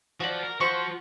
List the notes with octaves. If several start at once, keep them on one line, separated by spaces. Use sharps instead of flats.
F3 F#4 D5
A#4
F3 F#4 C5 C#6